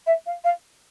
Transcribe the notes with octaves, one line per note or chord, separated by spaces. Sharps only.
E5
F5
F5